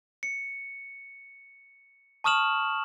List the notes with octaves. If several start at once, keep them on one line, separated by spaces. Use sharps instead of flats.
C#7
A5 C#6 D#6 F6 E7 F#7